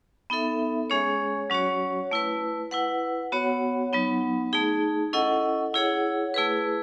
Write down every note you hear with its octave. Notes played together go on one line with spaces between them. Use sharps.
B3 D#4 A4 E5
G#3 C#4 G#4 C#5
F#3 C#4 F#4 C#5
A3 E4 B4
E4 B4 F#5
B3 F#4 C#5 F#5
F#3 B3 D#4
A3 D#4 G#4
C#4 E4 A4 D#5 F#5
E4 G#4 C#5 F#5
A3 E4 G#4 B4